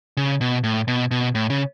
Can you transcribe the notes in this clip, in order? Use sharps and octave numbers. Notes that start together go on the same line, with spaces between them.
C#3
B2
A2
B2
B2
A2
C#3